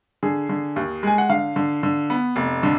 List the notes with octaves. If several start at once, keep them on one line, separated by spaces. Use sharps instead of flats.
D3 G#4
D3
D#2
G#3 G#5
F#5
D3 F5
D3
D3
B3
F1
D3